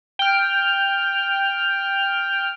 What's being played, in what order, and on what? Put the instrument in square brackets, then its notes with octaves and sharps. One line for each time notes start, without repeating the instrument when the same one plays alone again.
[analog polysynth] G5 F6